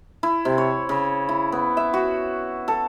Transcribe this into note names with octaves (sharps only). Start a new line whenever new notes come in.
E4
C3
C#5
C#3
E4
B3
E5
F#4
A4